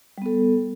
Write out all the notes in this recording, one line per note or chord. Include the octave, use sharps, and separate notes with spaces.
G3 B3 A4